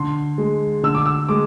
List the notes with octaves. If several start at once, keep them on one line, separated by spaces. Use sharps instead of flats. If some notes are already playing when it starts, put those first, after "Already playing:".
Already playing: D3 C6
G#3
D3 E6
D6
E6
G#3 D6